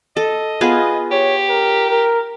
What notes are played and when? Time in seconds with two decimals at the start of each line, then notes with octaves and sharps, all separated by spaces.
0.17 A4 D#5
0.61 B3 F4 G#4
1.11 G4 C#5
1.49 A#4
1.90 A#4